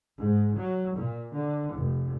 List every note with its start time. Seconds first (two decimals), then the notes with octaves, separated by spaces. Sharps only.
0.18 G#2
0.54 F#3
0.93 A#2
1.33 D3
1.73 F1